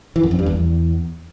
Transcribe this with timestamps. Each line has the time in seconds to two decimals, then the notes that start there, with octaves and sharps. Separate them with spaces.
0.16 E3
0.23 F#2
0.31 F2
0.39 G2
0.46 E2